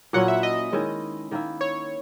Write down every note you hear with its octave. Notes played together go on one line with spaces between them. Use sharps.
A#2 F#3 C#4 E4 F#5
E5
D#5
D#3 G#3 C#4 E4
D#3 A#3 E4
C#5